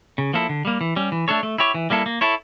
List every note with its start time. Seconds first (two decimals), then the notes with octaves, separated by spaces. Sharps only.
0.18 C#3
0.33 F3 A#3 E4 A4
0.49 D3
0.65 G3 A#3
0.81 E3
0.96 G3 C#4
1.12 E3
1.28 A3 D4 A4 C#5
1.43 A3
1.58 E4 G4 C#5
1.74 E3
1.90 G3 A#3 E4 A4
2.06 A#3
2.21 E4 A4 C#5